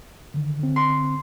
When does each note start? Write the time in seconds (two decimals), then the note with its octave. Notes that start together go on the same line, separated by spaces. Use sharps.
0.34 D3 D#3
0.59 D3 C4
0.76 C6